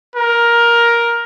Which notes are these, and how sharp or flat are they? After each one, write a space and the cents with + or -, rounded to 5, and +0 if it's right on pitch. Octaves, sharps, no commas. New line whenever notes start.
A#4 +10